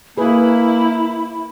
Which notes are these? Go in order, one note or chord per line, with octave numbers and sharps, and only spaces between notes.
A#3 E4 G#4 B4 B5